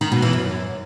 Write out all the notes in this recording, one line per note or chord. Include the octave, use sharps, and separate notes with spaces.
D#3
B2
E3
F#2